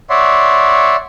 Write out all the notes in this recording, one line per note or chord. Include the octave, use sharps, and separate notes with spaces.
C#5 D5 E5 F#5 C6